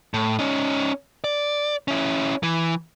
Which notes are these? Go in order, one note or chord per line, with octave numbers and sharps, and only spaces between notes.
A2
C#4 D#4
D5
C#4 E4
E3